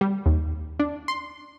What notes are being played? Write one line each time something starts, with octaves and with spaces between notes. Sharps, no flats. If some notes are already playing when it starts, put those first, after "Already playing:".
G3
D#2
D4
C6